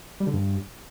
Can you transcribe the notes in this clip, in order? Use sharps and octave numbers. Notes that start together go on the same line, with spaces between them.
G3
D3
G2